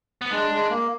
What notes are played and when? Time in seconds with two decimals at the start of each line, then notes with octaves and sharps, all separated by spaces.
0.21 B3
0.31 G#3 D4
0.51 G#3
0.70 A#3